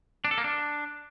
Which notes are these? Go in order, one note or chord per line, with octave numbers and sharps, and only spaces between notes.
D4
A4
A#3
D4